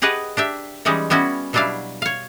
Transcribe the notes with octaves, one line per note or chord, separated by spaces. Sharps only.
G4 G#4 B4 D#5 F#5
D4 G4 E5
E3 G3 G#3 C#4 D#4
G3 B3 C#4 E4 F#4
B2 F#3 G3 D4 E4 F5
C#5 F5